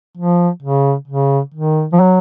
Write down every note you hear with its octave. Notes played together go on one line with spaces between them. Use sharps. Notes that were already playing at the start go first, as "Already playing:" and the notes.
F3
C#3
C#3
D#3
F3
F#3